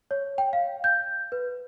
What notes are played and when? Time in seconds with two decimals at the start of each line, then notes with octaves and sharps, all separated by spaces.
0.11 C#5
0.38 G5
0.53 F5
0.84 G6
1.32 B4